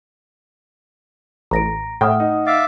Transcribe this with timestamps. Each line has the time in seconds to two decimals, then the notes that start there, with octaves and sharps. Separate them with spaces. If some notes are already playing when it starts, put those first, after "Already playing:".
1.51 A1 A#5 A#6 D7
2.01 A2 E5 F#5 G5 D#6 F6
2.20 D#4
2.47 E5 F5 D6 A6